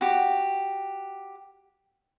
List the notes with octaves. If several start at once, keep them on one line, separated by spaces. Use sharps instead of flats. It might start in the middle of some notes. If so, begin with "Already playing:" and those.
F#4 G4